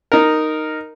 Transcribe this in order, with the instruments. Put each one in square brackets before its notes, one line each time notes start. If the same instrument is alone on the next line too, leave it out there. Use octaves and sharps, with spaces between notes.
[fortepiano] D#4 A#4